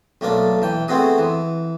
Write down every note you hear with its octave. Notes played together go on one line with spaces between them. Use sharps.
B1 A3 A#3 D4 A5
E3 G5
A3 B3 C4 F#4 G#4
E3